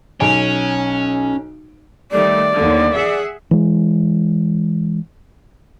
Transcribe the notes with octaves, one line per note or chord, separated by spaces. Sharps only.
B1 C#4 G#5 D7
D#3 G3 A3 D5
D#2 D3
G#4 E5 F#5
E3 G#3